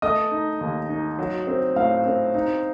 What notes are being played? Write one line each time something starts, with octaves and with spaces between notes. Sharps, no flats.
A3 D#5 D#6
D#4
D#2
D#4
F#3
C4
A2 F5
C4
D#4